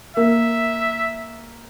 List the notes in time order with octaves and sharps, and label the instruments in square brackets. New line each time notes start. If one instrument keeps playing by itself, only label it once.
[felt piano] A#3 [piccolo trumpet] E5